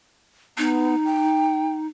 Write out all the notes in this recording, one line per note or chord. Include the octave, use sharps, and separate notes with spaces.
B3 D#4
G5